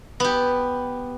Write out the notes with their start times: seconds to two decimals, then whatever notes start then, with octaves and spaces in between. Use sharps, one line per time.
0.20 B3 G4